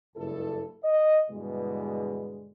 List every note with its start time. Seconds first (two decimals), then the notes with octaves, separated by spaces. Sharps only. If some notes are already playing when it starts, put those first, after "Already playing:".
0.16 F#1 C#2 G2 E4 A4
0.84 D#5
1.31 G2 B2 D3 E3 G#3